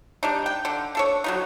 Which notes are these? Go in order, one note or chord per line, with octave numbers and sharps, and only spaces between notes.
G3 D4 D#4
G5
D3
D4 A4 C#5
F#3 G3 D#4